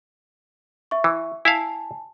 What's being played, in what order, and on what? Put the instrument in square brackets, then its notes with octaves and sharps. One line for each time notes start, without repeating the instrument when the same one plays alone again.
[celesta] E5 C#6
[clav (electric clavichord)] E3
[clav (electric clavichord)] E4 E5 F5 [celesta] G#5 A5